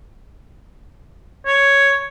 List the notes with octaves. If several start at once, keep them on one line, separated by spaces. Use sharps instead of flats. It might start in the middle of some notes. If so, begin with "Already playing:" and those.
C#5